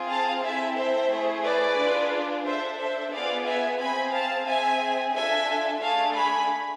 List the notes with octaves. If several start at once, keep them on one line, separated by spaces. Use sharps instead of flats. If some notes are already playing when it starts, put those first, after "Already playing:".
Already playing: C4 F4 G#4
F5 A5
C4 E4 A4 E5 G#5
C5 E5
A3 E4 G#4
B4 D5
D4 F4 G#4
D4 A4 C5 E5
C5 E5
B3 F4 G#4 D5 F5
E5 G#5
C4 G#4 G#5 B5
F5 A5
C4 G#4 E5 G#5
D4 F4 A4 E5 G#5
A3 D4 G#4 F5 A5
G#5 B5